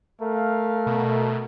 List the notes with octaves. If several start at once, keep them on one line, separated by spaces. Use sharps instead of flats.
A3 A#4 F5
B2